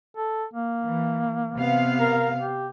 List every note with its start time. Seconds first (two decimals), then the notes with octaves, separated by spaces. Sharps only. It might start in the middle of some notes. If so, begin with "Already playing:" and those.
0.17 A4
0.53 A#3
0.83 E3
1.56 C3 B3 F5
2.00 A#4
2.39 G4